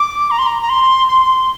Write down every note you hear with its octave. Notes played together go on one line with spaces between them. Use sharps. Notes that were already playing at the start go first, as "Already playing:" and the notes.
Already playing: D6
A#5
C6
A#5
A#5
C6
C6